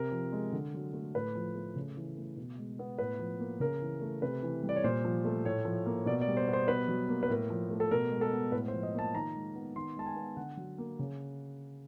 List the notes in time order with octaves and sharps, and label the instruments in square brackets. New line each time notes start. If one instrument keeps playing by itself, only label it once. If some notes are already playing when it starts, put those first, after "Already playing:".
Already playing: [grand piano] C3 A#4
F3
G#3
D3
F#3
A3
A2 B4
F3
A3
C#3
E3
A3
B2
G#3
B3
A2 B4
F3
A#3
C#3 A#4
E3
A3
C3 B4
E3
G3
D5
C#5
A#2 C5
F3
A3
A2 C#5
F3
A#3
B2 D5
D5
G3
C5
B3
C5
B2 B4
F#3
A#3
B4
A2 A#4
F3
A3
A4
B2 A#4
G#3
A4
B3
A2 B4
C5
F3
D#5
A#3 A5
D#3 A#5
G#3
B3
D#3 C6
G#3 A5
G#5
B3
D3 F#5
F#3
A#3
C#3